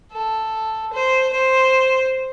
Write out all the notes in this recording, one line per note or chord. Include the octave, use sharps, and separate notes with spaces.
A4
C5
C5